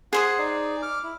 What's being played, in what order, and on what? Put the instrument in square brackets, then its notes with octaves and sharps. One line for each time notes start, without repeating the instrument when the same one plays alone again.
[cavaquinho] G#4 C5 D#6 [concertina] F#5
[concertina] D#4 D5
D6 F6
E4